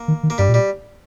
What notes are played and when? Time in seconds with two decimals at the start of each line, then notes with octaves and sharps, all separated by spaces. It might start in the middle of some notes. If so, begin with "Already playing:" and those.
Already playing: A#3
0.08 D#3
0.23 D#3
0.30 A#3
0.38 G2 G3
0.49 A#2
0.54 G3